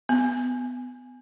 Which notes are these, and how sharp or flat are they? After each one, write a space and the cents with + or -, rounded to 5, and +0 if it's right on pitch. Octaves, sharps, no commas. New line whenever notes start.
B3 +20